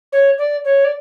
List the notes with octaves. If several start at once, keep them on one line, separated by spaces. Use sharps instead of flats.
C#5
D5
C#5
D5